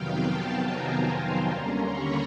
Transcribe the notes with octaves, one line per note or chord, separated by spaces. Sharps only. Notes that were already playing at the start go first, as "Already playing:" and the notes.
Already playing: F2 C3 D#3 F#3 B3 F5 G5
G5 A5
G#5 A#5
A#5 C6
D#2 D3 G3 A#3 C#4 A#5 C6
B5 C#6